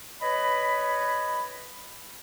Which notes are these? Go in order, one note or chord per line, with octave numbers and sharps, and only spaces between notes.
B4 C#5 D#5 B5